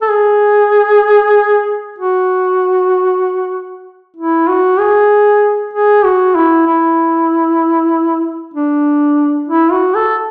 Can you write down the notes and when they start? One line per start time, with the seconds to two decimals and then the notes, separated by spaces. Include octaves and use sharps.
0.02 A4
0.10 G#4
1.98 F#4
4.17 E4
4.48 F#4
4.79 G#4
5.73 G#4
6.04 F#4
6.35 E4
6.66 E4
8.54 D4
9.48 E4
9.72 F#4
9.95 A4